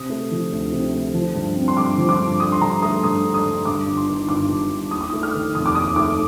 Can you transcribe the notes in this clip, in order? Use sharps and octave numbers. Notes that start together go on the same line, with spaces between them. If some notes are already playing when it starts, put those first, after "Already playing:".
Already playing: C3 D#6
A3
F3
D2
C3
A3
F3
G2
C4
C6
G2 D6
F3
D6
G2
D3 D#6
C6
G2 A#5
A3 D#6
G2 D#6
D3
D#6
G2
G2 D6
G1
C6
D#3
G1 D6
G2
G1
D#2 D#6
D6
A3 D#6
F6
D#3
F1 D#6
D6
D#2 D#6
A3 D6